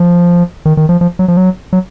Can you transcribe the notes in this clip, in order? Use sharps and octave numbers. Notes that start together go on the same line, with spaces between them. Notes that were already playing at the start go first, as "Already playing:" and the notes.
Already playing: F3
D#3
D#3
F3
F3
F#3
F3
F#3
F#3